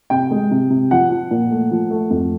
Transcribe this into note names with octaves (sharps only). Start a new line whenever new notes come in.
C3 G5
G#3
C3
C3
F3 F#5
F3
A#2
A3
F3
A3
F2